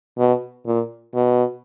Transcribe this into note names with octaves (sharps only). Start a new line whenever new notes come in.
B2
A#2
B2